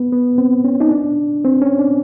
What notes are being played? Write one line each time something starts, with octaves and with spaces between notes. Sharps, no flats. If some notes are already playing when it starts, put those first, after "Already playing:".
Already playing: B3
B3
C4
C#4
D#4
D4
C4
C#4
D4